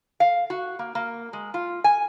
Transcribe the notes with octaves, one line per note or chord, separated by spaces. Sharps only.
F5
F#4
A#3
A#3
G#3
F4
G#5